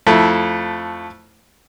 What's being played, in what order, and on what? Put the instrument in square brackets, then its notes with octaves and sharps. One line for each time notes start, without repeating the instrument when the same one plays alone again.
[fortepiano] F2 A3 E4